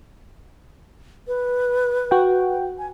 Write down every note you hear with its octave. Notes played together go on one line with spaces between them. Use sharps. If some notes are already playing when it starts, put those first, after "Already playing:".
B4
F#4 G5
G#5